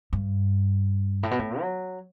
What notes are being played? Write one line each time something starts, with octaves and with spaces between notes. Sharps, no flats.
G2
A2
B2
A2
F#3